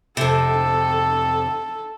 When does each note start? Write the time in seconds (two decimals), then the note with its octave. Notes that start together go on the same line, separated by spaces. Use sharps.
0.17 F2 C3 A4